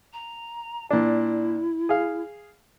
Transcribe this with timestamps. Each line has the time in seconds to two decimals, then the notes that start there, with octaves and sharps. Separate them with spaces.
0.13 A#5
0.91 A#2 D4 E4
1.89 G#4 F5